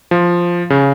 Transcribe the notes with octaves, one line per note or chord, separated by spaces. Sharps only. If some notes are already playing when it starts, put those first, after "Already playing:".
F3
C#3